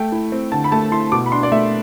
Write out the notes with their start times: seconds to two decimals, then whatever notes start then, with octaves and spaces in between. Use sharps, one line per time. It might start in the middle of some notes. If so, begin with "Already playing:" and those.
Already playing: A3 G5
0.12 E4
0.32 C4
0.52 D3 A5
0.64 B5
0.72 A3 A5
0.92 E4 C6
1.12 B2 D6
1.26 B5
1.32 D4 C6
1.43 D5
1.52 A3 E5